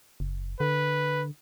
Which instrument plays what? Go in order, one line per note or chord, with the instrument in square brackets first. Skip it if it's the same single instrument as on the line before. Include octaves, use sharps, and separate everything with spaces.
[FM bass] F#1
[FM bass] D3 [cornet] B4